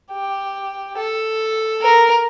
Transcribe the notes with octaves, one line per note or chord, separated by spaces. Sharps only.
G4
A4
A#4